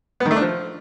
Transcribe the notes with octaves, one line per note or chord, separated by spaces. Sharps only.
B3
D#3
A3
D4
F3